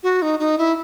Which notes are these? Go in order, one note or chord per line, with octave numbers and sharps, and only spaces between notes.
F#4
D#4
D#4
E4